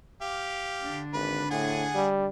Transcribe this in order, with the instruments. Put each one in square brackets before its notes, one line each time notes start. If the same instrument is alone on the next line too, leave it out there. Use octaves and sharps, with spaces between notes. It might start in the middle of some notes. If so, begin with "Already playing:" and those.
[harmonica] G4 F5
[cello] D3 D4
[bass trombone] G#1 [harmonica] B4
[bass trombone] A2 [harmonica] G#4 F#5 G#5
[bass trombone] G3